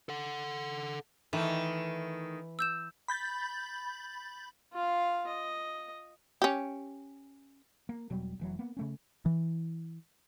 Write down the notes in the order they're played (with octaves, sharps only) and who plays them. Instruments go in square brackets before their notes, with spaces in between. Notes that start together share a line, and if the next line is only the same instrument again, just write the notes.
[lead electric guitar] A4 F#5
[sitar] D#3 A3 [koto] E3
[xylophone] E6 G6 E7
[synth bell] B5 G6 A6
[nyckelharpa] F4 F5
D#5
[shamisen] C#4 G4
[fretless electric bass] A#3
E1 B2 F#3 G3
F1 E3 F#3
A#3 B3
C#3 A3 C#4
[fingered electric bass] E3